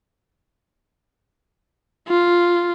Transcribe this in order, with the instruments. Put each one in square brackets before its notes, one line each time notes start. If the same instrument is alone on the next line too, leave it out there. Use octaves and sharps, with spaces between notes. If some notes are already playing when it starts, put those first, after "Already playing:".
[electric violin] F4